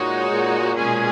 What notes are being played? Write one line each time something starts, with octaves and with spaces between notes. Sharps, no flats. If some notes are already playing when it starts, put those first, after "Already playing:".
Already playing: A#2 G#3 D#4 F#4 C#5
A#2
B2 G#3 C#4 G#4